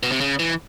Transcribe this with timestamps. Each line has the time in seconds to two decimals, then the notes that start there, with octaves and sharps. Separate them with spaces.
0.03 B2
0.12 C3
0.21 C#3
0.39 E3